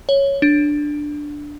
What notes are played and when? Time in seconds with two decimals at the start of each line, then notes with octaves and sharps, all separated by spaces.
0.09 C#5
0.42 D4